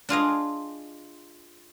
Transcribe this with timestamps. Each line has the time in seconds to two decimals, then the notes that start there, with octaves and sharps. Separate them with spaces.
0.09 D4 F4 G#4 D#5